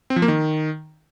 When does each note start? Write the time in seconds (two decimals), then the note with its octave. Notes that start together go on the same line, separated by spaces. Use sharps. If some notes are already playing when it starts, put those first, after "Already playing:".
0.10 C4
0.16 F3
0.22 A#3
0.28 D#3